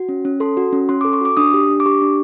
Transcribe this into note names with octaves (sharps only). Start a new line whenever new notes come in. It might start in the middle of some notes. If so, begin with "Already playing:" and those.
Already playing: F#4
C#4
C#4
A4 C6
F#4
C#4
C#4 C6
D6
A4
C#6
F#4 D6
D4 D#6
G4
D4
D6
G4 C#6
D4